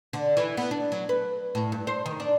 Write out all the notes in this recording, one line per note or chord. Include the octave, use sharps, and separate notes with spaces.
D3
E3
B3
D4
F#3
B4
A2
G2
C5
D#3
D4